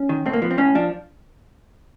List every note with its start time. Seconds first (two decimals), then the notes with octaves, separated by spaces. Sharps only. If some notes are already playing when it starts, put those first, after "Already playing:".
Already playing: C#4
0.09 D#3
0.26 A2 C4
0.33 A#3
0.42 F3 B3
0.51 C4
0.58 A2 C#4
0.75 F3 D4